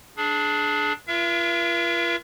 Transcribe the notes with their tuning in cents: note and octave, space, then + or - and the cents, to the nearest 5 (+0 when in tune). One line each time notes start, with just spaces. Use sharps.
D4 +0 G#4 +30
F4 -35 A#4 +40 E5 +45